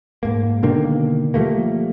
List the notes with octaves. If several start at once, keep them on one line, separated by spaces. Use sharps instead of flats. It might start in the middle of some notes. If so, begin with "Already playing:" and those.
G#2 A#3
B2 D3 D#3 A#3
F3 G3 A3 A#3